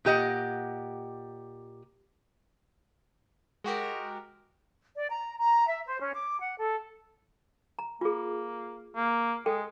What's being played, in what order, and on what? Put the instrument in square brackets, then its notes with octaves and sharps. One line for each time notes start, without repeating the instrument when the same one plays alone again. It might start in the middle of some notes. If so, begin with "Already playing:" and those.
[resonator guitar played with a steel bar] A#2 G4 D#5 F#5
[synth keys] G#3 F#4 G4 A#4
[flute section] D5
A#5
A#5
E5
C5
C#4
D6
F#5
A4
[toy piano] A#5
[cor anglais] A#3 [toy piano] F4 G#4
[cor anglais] A#3
[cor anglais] G#3 [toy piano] A4 G5